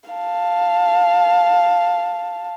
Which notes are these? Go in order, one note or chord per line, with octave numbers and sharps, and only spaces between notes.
F5 A5